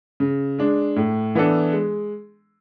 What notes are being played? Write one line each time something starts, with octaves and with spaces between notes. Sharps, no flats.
C#3
G#3 D4
A2
E3 B3 D4 A4
G#3